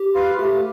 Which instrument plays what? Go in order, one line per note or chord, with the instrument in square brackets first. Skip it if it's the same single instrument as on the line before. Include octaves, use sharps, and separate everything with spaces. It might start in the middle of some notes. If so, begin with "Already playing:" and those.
Already playing: [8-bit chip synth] G4
[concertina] F4 B4 F5
[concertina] A3 [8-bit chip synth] G4